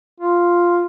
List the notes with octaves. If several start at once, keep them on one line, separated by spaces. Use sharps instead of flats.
F4